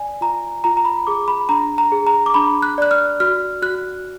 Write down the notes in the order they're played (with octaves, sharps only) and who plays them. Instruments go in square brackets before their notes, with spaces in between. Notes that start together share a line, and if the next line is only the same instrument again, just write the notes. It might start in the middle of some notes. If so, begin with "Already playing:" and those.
Already playing: [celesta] D5 G#5
F4 A#5
F4 A#5
A#5
B5
G#4 D6
B5
D4 A#5
A#5
G#4
A#5
D6
D4 B5
F#6
D5 F#6
F6
F#4 F6
F#4 F#6